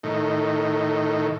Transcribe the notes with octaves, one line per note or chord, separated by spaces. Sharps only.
A2 D#3